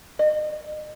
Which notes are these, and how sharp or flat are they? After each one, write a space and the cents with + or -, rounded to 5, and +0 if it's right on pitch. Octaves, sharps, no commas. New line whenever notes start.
D#5 -35